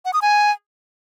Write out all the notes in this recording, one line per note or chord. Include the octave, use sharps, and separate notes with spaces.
F#5
D#6
G#5